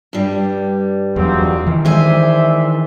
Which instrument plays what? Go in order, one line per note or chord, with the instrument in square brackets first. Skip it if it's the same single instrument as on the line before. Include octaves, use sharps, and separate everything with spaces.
[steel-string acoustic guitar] G2 G3
[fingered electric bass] E2 F#3 [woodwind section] B2 A#3 C4
[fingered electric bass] D#3 E3
[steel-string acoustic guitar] G#3 C5 G#5 [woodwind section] D5 E5